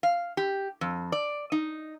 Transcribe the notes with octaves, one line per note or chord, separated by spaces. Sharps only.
F5
G4
F2
D5
D#4